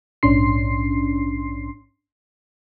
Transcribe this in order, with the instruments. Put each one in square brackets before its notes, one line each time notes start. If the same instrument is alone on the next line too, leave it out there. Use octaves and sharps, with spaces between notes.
[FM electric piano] A#1 G#2 C#4 D4 C6 C7